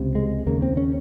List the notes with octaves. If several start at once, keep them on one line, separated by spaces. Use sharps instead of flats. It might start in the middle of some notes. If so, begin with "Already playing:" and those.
Already playing: C#2 C3
G#3
D#2 C#3 A#3
C4
C#4